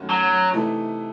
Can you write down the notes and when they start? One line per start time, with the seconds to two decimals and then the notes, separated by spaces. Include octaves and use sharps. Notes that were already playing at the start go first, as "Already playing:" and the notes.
Already playing: F#2 D#3 A3 C#4 F#4
0.09 F#3
0.53 C3 E3 A3 D#4 A4